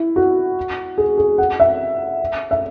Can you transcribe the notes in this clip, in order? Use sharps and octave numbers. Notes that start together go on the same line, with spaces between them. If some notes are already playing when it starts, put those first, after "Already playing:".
Already playing: E4
F#4
G#4
G#4
F#5
E5
E5